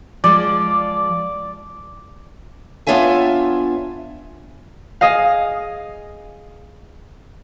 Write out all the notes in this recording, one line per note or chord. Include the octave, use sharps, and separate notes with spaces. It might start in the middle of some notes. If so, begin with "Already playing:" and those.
F3 G#3 D5
B3 D4 F4 C#5 E5 G#5
G#4 D#5 F5